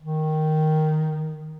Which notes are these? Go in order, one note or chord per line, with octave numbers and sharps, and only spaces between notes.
D#3